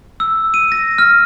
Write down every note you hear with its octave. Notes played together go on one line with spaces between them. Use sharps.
E6
D#7
A#6
F6